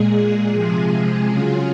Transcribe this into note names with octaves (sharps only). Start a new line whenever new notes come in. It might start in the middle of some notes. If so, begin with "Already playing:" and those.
Already playing: A#2 G#3 G#4
C3 F3 G#3
C#3 F#3 F4